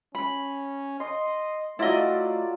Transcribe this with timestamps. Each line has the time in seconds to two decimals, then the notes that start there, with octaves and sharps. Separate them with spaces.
0.15 C#4 B5
1.00 D#5 C6
1.79 F#3 A3 E4 F4 D5 D#5